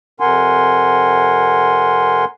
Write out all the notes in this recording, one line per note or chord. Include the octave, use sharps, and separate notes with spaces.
F2 C3 A#4 F#5 G#5 C6